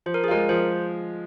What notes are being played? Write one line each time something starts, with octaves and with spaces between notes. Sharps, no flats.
F3 C5
A#4
G#4
G#3 F4 A#4
F3 C5